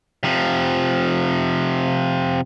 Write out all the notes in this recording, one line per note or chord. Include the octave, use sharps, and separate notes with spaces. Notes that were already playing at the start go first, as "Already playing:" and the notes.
C3 F3